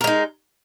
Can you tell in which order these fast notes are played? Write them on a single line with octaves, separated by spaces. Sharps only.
A#4 G#3 D#4